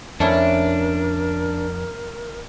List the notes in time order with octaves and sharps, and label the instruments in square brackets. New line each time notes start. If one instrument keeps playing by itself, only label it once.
[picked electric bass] F2 [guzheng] A3 C#4 E4 [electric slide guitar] D4 [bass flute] A#4